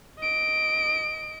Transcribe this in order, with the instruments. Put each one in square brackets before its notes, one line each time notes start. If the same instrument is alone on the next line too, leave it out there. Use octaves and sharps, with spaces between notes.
[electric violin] D#5 D7